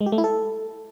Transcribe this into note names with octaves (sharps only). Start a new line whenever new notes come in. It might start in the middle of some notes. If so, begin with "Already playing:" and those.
G#3
G4
A3
E4
A4